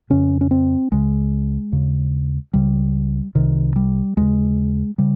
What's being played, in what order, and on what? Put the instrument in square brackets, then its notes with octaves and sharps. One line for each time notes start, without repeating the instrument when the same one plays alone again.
[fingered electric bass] F2 C#3 C#4
C#4
C4
C#2 C#3 G#3
D#2 C#3
C#2 C#3 G3
C2 C3 D#3
G3
D#2 C#3 G#3
C#3 G3